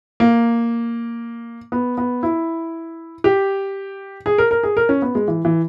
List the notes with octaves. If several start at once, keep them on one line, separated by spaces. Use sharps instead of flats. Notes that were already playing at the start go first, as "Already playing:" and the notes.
A#3
B3
B3
E4
G4
G#4
A#4
A#4
G#4
A#4
C#4
B3
G#3
E3
E3